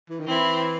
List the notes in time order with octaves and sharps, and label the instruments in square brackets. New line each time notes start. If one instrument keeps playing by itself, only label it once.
[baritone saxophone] E3
D#3
[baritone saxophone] E3 [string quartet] C4 E4